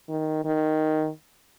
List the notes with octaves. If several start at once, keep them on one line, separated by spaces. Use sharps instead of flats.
D#3
D#3